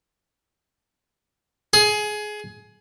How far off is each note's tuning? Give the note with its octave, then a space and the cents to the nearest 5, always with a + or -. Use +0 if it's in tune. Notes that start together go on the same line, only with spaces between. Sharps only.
G#4 +20